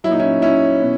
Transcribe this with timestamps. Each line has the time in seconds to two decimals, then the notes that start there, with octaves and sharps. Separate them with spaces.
0.04 F#3 E4
0.08 A#2 D#4
0.20 C#4 E4
0.42 C#4 E4
0.82 B2